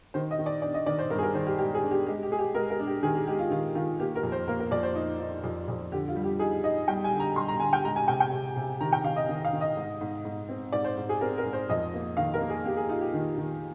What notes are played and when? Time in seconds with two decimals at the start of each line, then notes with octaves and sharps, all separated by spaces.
0.14 D#3 C5
0.31 D#5
0.38 D#3
0.46 D5
0.62 D4 D5
0.74 D#5
0.86 D#3 D5
0.99 C5
1.10 G2 A#4
1.18 G#4
1.23 A#4
1.34 D#3 C5
1.46 G4
1.59 G#3 G4
1.74 G#4
1.83 D4
1.91 G4
2.07 G#3 G4
2.23 G4
2.31 G#3 G#4
2.39 G4
2.54 G#3 A#4
2.70 A#4
2.80 D4
2.87 G4
3.03 D#3 G#4
3.15 G4
3.27 G#3 G4
3.39 F4
3.51 D#3 F4
3.75 D#3 F4
3.99 A#3 G4
4.16 A#4
4.23 F2
4.32 C5
4.48 A#3 A#4
4.60 A#4
4.71 F2 D5
4.83 C5
4.95 D#4
5.20 D#4
5.44 F2
5.68 F2
5.92 D3 G4
6.08 F4
6.16 G3
6.24 G4
6.39 D#4 G#4
6.64 D#4 D#5
6.88 G3 G5
7.04 G#5
7.12 D3
7.20 A#5
7.36 G3 C6
7.48 A#5
7.60 D3 G#5
7.73 G5
7.84 G#3 A#5
7.96 G#5
8.08 C3 G5
8.20 G5
8.32 C3
8.56 C3
8.81 D#3 A#5
8.93 G5
9.04 D#3 F5
9.16 D#5
9.29 D#3
9.45 F5
9.53 D#3
9.61 D#5
9.77 G#2
10.01 G#2
10.25 G#2
10.49 C4
10.72 G#2 D5
10.84 C5
10.97 G#2
11.09 G#4
11.21 C4 A#4
11.38 A#4
11.45 G#2
11.53 C5
11.69 F2 D#5
11.93 A#3
12.17 D#3 F5
12.34 A#4
12.41 A#3
12.50 G#4
12.65 A#3 G4
12.77 G#4
12.89 D#4 F4
13.01 G4
13.14 D#3
13.38 D#3